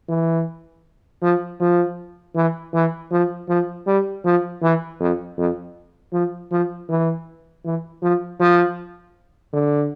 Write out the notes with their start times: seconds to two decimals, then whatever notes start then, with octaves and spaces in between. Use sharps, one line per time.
0.09 E3
1.22 F3
1.60 F3
2.35 E3
2.74 E3
3.11 F3
3.48 F3
3.87 G3
4.25 F3
4.62 E3
5.00 F2
5.38 F2
6.13 F3
6.51 F3
6.89 E3
7.64 E3
8.02 F3
8.40 F3
9.53 D3